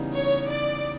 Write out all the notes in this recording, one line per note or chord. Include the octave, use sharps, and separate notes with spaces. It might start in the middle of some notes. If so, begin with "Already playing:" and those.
Already playing: C#3 E3 G3 B3 D#4
C#5
D5